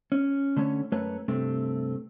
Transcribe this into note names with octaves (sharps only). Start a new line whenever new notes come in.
C#4
D3 A3 C#4 C#5
F#2 A3 B4 C#5
G2 C3 A3 C4